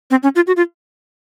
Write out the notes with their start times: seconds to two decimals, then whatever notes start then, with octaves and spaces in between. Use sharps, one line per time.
0.11 C4
0.23 C#4
0.36 F4
0.47 F#4
0.57 F4